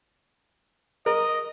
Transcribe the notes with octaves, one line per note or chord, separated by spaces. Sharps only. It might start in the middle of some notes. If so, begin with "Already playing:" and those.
A#4 D#5